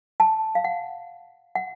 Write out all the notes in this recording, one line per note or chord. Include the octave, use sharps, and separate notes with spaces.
A5
F5
F#5
F#5